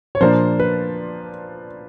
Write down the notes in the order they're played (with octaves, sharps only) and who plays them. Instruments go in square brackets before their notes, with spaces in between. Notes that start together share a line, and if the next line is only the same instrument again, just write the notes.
[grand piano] C#5
A#2 F3 A#3 D4 C5
B4